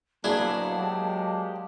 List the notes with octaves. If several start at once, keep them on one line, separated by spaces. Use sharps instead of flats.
D2 B2 F#3 A#3 D4 E4 G#4 A5
F#3 G#3 A#3 G4